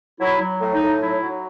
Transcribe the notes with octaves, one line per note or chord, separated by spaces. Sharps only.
F#3 E4
F#3
A2
D#4
A2
F#3 E4
F#3